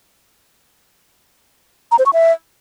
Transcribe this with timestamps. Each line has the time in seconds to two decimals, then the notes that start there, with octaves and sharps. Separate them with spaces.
1.92 A#5
1.99 C5
2.06 C#6
2.13 E5